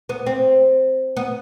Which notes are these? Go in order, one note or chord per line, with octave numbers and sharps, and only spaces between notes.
B3
C4
B3